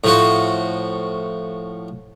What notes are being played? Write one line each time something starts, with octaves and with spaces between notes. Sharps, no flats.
A2 F3 F#4